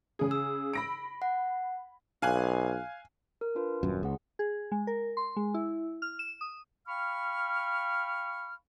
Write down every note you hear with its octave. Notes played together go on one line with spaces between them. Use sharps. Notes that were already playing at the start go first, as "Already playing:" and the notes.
C#3 G#4
E6
B5 A#6 D7
F#5
B1 F5 G#5 F#6
A#4
D4 F4 B4
D#1 F#2
C#2 G#4 F#5
G#4
G#3
A#4
C6
G#3
E4
F6
E7
D#6
F5 G5 B5 C#6 F6